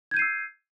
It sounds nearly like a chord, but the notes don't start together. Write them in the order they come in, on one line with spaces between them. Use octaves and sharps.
G#6 G6 D#7 C7 E6